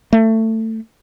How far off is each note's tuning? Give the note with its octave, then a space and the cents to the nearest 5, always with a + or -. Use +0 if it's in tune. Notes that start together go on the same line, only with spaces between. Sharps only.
A3 +20